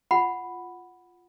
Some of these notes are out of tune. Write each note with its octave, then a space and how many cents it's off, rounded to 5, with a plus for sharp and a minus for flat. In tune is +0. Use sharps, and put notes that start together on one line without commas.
F4 +0 F#5 +0 B5 +0